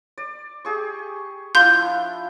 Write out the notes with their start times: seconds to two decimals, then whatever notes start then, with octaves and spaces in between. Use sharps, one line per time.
0.18 D5
0.65 G4 G#4 C#6
1.55 F3 D4 E4 C6 G6